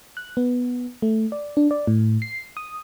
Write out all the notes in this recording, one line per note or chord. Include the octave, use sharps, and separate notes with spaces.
F#6
B3
A3
D5
D4
D5
A2
C7
D#6